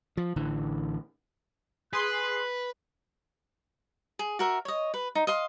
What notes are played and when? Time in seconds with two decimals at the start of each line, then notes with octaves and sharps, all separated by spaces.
0.17 F3
0.36 A1 D3 E3
1.93 G#4 B4 C6 F#6 C7
4.19 G#4
4.39 F#4 A#4 E5
4.65 C#5 D#5
4.94 B4
5.15 D#4
5.27 D#5 F5 C6